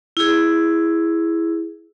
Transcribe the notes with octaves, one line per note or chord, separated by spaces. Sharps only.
E4 G#4